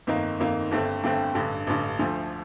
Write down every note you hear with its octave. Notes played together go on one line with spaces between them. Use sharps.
G1 F2 D#3 A#3 D#4
G1 F2 D#3 A#3 D#4
G1 G2 D3 A3 C4
G1 G2 D3 A3 C4
A1 G2 D3
A1 G2 D3
D2 D3 F3 A3